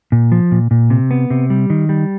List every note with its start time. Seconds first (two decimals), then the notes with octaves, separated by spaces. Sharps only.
0.12 A#2
0.32 F3
0.52 A#2
0.71 A#2
0.90 C3
1.11 B3
1.30 C3
1.50 G3
1.70 D#3
1.89 G3